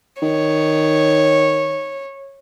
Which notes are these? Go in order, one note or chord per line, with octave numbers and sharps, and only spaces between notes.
D#3 C#5